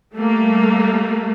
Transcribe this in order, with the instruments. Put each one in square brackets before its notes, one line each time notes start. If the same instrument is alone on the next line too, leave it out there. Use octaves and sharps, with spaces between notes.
[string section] G3 A3 A#3